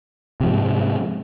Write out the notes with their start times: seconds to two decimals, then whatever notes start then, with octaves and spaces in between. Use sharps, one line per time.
0.40 C3
0.43 F3
0.46 G#2